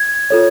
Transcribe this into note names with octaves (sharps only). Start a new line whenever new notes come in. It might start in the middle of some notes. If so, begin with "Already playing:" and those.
Already playing: G#6
F4 A4 C#5